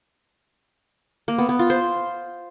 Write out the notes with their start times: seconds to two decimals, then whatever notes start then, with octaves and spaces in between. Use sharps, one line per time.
1.28 A#3
1.38 B3
1.49 B3
1.59 F4
1.70 C5